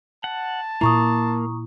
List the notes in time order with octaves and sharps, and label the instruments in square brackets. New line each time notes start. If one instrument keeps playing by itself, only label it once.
[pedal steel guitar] F#5 [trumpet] A5
[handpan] A#2 E4 [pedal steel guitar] A#3 [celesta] A#5 C#6 D#6